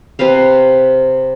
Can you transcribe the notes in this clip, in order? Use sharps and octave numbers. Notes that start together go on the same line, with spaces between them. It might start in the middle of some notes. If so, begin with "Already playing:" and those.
C3 C4 B4 F5